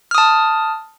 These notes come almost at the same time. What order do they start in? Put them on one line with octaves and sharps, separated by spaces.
F6 D#6 A5